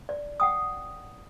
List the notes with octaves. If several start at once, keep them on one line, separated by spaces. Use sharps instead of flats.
D5
F#5 G5 D#6